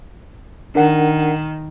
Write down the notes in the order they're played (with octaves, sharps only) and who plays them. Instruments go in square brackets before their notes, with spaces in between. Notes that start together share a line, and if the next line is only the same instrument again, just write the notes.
[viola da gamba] D#3 [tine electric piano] D4 A#4 F#5